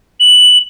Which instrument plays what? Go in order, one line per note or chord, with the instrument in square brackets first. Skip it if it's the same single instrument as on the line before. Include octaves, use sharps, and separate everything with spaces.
[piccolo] F#7